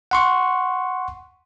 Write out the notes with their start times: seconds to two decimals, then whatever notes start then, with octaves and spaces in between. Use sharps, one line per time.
0.11 F#5 C6 C#6